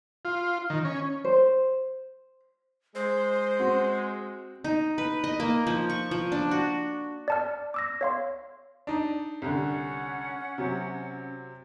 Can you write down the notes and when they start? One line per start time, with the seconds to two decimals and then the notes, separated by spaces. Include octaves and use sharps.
0.25 F4
0.70 D#3
0.85 C#4
1.24 C5
2.95 G#3 C5
3.59 C4 F#4
4.64 D#4
4.98 B4
5.24 D#5
5.40 A#3
5.67 F3
5.89 C#6
6.11 F3
6.32 D4
6.51 F#4
7.28 D5 A5 F6
7.74 D6 E6 A#6
8.01 C#5 F5 C6
8.87 D4 D#4
9.42 C2 D3 C#4 F#5
10.58 C3 F#3